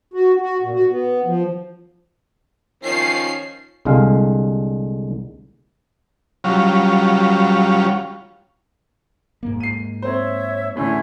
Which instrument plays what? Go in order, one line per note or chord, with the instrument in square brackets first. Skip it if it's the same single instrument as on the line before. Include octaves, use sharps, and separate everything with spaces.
[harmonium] F#4
F#4
A#2
F#4
B3
F3
[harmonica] D#3 F3 C#4 [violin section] C7
[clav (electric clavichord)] C2 D3 G#3 F5
[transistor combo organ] F#3 G3 C#4 F4
[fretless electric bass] G#2 A#3
[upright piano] C7 D#7
[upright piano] C4 C5 [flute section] C#5 E5
[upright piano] E2 A2 D3 [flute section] C#4 E4